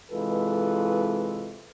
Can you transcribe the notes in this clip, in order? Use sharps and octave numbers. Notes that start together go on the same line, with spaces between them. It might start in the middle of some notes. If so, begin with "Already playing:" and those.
C3 E3 G#3 F4 A4 B4